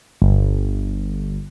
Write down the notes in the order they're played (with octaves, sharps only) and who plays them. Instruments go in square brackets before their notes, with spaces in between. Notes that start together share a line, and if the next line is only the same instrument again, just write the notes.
[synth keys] G1